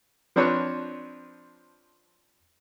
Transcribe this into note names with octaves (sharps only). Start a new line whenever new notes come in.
F3 C4 D4 B4 C#5